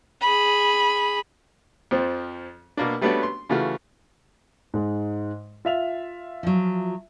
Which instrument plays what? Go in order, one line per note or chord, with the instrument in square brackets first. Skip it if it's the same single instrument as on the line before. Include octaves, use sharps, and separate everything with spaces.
[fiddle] G#4 B5
[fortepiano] F2 F3 C4
B2 A#3 D4
G3 A3 B3 C#4 D4 F#4
C6
C#3 E3 A3 F4 F#4
[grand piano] G#2 G#3
F4 E5 F7
[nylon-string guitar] F3 F#3